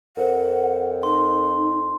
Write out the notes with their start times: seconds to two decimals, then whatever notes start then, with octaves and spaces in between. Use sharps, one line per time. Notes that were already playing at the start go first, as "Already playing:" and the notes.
0.17 F2 A#4 C5 F#5
1.03 D#4 C6